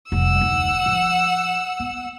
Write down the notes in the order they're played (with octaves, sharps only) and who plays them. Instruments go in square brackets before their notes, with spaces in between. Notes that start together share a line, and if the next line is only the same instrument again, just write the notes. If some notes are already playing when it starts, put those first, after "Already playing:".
[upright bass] F1 G3 [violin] F#5 E6
[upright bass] D2 D#4
F3
B3